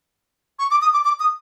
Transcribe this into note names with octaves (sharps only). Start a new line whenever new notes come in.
C#6
D6
D#6
D6
D6
D#6